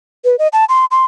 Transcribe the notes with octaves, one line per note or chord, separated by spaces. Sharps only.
B4
D#5
A5
C6
C6